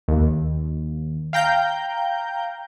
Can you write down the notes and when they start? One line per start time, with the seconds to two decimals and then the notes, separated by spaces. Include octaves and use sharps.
0.08 D#2
1.33 F5 G5 A#5 G6